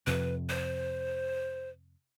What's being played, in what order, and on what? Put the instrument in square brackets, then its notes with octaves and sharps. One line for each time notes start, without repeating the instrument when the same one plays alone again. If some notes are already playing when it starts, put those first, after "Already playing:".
[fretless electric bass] F2 C3 [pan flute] B4
[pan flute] C5